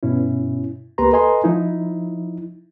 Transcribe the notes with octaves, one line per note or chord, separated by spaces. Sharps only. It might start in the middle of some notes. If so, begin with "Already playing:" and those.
G2 B2 C#4 E4
C#2 A#3 G4 B4 A#5 C6
A4 B4 D#5 G#5 A#5 C6
F3 D#4 E4